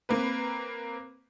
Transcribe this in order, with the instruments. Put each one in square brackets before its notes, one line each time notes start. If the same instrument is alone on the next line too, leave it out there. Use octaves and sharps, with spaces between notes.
[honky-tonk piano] A#3 C4 B4